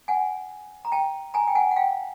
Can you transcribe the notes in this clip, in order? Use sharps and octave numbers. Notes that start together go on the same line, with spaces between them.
F#5 G#5
A#5
G5 A5
G#5 A#5
G5
F#5 G#5
F#5
F5 G5